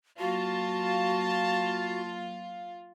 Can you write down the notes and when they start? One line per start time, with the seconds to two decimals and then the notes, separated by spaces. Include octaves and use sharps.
0.19 F#3 A#3 F4 F#4 A5